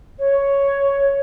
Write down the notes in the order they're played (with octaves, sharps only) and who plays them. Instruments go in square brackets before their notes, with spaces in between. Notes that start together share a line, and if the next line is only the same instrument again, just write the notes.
[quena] C#5